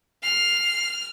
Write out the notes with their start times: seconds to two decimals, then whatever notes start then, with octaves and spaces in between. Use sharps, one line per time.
0.23 F6 C7